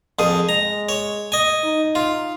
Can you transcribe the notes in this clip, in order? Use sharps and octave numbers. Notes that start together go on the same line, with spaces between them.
F2 G#4
G#3 A#5
C#5
D#5 G#5
D#4
F4